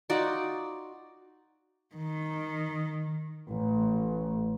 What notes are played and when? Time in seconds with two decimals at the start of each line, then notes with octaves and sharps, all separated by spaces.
0.10 D#4 F4 F#4 D5
1.95 D#3
3.50 A1